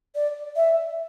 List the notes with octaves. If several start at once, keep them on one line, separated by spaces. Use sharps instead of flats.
D5
E5